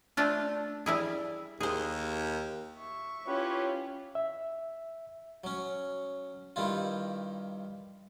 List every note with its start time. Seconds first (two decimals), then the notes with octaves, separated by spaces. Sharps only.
0.17 A3 D4 F4
0.86 G3 E4 G#4
1.60 D#2 G#4 C5
2.78 E5 C#6
3.27 C#4 E4 F4 G4 B4 C#5
4.15 E5
5.44 F#3 C#4
6.56 G2 D#3 G3 E4 F4